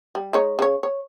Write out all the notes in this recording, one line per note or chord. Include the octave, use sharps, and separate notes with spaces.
G3
G#3 D#4 C#5
C#3 C#5
C#5